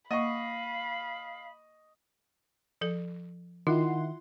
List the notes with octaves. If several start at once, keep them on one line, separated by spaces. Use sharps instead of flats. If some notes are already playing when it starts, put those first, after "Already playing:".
A#3 D#5 F5 B5 C#6
F3 A4
D#3 E4 F4 F#5 C6